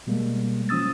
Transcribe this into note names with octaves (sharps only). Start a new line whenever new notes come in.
B2 G3 G#3 A#3
F3 C#4 D#6 E6 A6